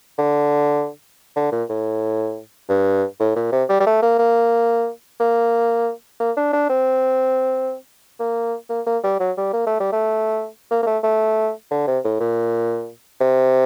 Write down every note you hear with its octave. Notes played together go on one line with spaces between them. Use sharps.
D3
D3
A#2
A2
G2
A2
A#2
C3
G3
G3
A3
A#3
A#3
A#3
A#3
D4
D4
C4
A#3
A#3
A#3
G3
F#3
G3
A#3
A3
G3
A3
A#3
A#3
A3
A3
D3
C3
A2
A#2
C3